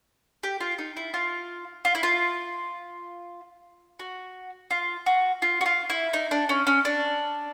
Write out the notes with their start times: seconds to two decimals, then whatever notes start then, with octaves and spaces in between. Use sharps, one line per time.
0.43 G4
0.61 F4
0.79 D#4
0.97 E4
1.14 F4
1.85 F4
1.95 E4
2.03 F4
4.00 F#4
4.71 F4
5.06 F#4
5.42 F4
5.61 F#4
5.66 F4
5.90 E4
6.13 D#4
6.31 D4
6.49 C#4
6.67 C#4
6.85 D4